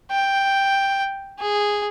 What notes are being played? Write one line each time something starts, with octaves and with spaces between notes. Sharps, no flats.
G5
G#4